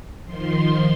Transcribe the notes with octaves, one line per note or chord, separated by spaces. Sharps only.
D#3 F3 C6